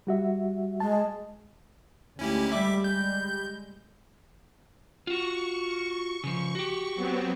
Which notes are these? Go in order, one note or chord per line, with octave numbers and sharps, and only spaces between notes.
G3 F#4 E5
G#3 A5
D2 G#3 C#4 E4 G4
G3 E5 B5 D6
G#3 G6
F4 F#4 C#6
C#3 F3 C#6
F#4 G4
F#3 B3 C4